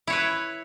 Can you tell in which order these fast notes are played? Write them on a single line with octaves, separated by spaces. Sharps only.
E4 C#5 B4